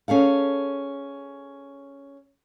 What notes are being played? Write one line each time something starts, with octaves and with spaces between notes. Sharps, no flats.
C#4 G#4 A4 F5